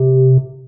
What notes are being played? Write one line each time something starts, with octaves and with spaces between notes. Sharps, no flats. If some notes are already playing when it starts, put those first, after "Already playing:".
Already playing: C3